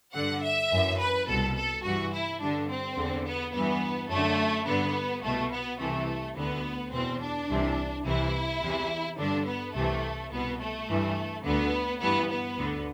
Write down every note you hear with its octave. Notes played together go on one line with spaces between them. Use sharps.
G2 D3 F#5
E5
F#2 E3
B4
C2 B2 A4
A4
G2 E3 F#4
E4
G2 D3 D4
C4
E2 D3
B3
G2 E3 B3
F#2 D3 A3
G2 D3 B3
C2 B2 A3
B3
C2 C3 E3 A3
D2 D3 B3
E2 B2 C4
D4
C2 C3 E3
C2 C3 E3 E4
E2 C3 E3
G2 D3 D4
B3
C2 C3 E3 A3
C2 B2 B3
A3
G2 E3
D2 D3 B3
G2 E3 B3
B3
D2 D3